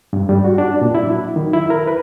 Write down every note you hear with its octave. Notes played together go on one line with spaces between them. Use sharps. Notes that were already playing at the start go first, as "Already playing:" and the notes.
G2
G3
F#4
D4
A#2
E4
F#3
D#3
E4
A#4
B4